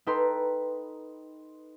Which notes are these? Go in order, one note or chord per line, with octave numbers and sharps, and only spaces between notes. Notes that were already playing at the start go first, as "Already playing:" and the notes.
D#4 A4 B4 G5 A#5 C6